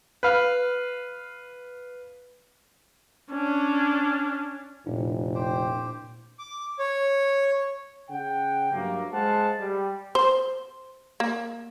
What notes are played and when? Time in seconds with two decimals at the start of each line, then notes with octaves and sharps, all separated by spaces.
0.23 B4 F5
3.32 C#4 D4
4.86 F1 A#2 D4 E4
5.35 G4 C5 G5
6.39 D6
6.79 C#5
8.10 C#3 F#5 G5
8.72 G2 F#3 A3 A#3
9.12 G#3 C5 F5 F#5 A5
9.60 G3
10.15 C5
11.20 A#3